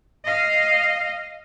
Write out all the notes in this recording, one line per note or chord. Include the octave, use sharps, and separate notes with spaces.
D#5 F5